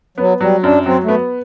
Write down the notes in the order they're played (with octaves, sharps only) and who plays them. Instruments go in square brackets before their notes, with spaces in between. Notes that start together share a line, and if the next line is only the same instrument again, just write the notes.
[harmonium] F#3 [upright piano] B3
[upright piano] F#3 [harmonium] G3
[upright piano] F#2 [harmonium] D4
[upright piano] F#3 [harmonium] C4
[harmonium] A3
[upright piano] B3